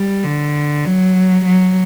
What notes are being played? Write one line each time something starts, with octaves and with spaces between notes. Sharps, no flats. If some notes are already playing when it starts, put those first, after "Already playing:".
Already playing: G3
D3
F#3
F#3